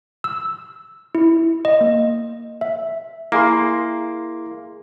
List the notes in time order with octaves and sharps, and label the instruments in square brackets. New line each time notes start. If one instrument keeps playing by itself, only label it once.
[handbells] E6
E4
D#5
A#3
E5
[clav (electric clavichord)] A#3 [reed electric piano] E4 G#4 C6